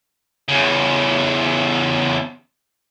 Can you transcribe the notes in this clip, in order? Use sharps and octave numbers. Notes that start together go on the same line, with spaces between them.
E2 C#3